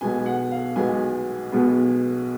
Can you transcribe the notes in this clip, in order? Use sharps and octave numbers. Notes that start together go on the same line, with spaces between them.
B1 B2 G#3 B3 G#5
F#5
F5
B1 B2 G#3 B3 G#5
B1 B2 G#3 B3